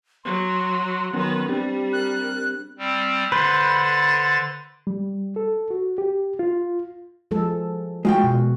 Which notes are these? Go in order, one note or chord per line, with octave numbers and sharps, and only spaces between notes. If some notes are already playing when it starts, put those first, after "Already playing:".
F#3 C6
D#3 F#3 B3 C#4 B4
G3 C4 D4 G4
A#4 F#6
G3 C4
D3 B4 C5 A6
G3
A4
F#4
G4
F4
F3 G#3 A4
G#3 F4 F#4 G5
B2